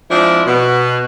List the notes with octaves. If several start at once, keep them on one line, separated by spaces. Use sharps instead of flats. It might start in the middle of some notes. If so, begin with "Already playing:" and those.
F3 G#3 C4 D4 E4
B2